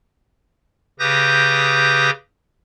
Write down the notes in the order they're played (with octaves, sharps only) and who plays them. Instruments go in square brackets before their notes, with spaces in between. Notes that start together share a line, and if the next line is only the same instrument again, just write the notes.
[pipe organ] C#3 G4 B4 D#6 G6 A#6